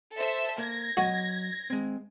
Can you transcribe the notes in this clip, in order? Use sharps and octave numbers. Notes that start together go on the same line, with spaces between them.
A4 C5 E5
A#3 G#6 A#6
F#3 F#4 D#5
G#3 C4